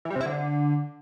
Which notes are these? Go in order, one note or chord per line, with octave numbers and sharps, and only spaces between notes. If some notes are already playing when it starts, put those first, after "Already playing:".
E3
G3
C3
E4
D3